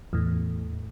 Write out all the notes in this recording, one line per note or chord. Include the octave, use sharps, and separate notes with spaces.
E2 A2